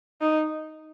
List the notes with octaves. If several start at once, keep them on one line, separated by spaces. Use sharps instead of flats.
D#4